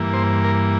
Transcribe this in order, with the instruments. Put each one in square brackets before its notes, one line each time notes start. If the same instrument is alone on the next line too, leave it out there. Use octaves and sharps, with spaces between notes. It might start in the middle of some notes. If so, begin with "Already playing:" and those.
Already playing: [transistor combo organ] G2 E3 A#3
C5
A#4